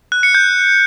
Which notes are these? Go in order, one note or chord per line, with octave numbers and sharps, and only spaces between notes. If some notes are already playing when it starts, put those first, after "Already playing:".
F#6
C#7
G6